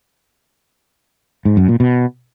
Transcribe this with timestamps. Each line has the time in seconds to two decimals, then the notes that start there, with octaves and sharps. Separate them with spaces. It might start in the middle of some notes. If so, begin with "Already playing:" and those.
1.45 G#2
1.57 F#2
1.68 A#2
1.80 B2